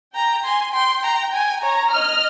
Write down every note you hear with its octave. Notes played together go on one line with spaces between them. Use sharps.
G5 A#5
G#5 C6
G5 C6
A#5
G#5
C#5 A#5
D#5 F6